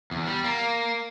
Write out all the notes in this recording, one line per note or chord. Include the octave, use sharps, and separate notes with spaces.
E2
G3
A#3